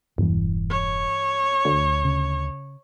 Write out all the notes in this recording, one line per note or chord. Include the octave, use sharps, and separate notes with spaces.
E1 G2 E3
C#5
D2
C#3